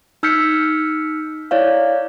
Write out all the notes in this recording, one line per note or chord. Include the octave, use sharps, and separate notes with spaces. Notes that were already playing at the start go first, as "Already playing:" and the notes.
D#4 E6 F6 G6 B6 C#7
E4 C#5 D5 F5